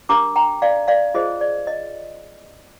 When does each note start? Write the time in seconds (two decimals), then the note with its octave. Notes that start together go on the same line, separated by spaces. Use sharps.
0.09 D4 G4 A#4 A#5 D6
0.36 G5 A#5
0.62 D5 F5
0.88 D5 F5
1.14 F4 G#4 C5 D#5
1.41 D5
1.67 D#5